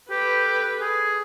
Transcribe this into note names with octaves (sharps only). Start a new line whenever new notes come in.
G4 A4 B4
G#4